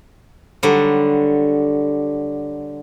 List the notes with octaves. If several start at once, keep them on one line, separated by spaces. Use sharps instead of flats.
D3 F#3 G3